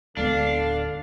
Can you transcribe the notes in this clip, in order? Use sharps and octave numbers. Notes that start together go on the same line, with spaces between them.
D1 D3 G#3 B3 D4 F5